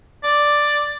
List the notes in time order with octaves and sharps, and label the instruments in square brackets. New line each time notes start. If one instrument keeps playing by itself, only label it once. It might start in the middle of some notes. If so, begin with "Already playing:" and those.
[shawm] D5